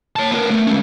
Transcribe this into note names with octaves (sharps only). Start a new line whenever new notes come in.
C#5 A5
B3 A#4
A3
G#3 C#4